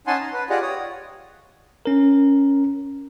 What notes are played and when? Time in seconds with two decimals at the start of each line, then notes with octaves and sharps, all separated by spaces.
0.07 C#4 D#4 F#5 G#5 A5 C6
0.20 A#5
0.33 B4
0.50 F4 G4 G#4 D5 D#5 F#5
0.62 C#5 D#6
1.86 C#4 A#4